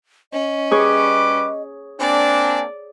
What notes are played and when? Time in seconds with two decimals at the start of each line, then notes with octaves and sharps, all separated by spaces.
0.33 C#4 D#5
0.71 G3 G#4 B4 C#5 D6
2.00 A#3 C4 D4 D5 G#5